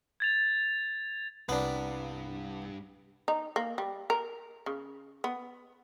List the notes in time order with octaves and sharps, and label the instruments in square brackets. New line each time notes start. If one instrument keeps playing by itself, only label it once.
[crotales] G#6 A6 F7
[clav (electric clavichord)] C2 [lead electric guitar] G2 [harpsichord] B3 [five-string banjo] D4 B4
[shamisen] D#4
A#3
G3
A#4
C#3
B3